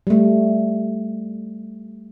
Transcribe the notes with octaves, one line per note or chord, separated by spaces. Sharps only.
G3 A3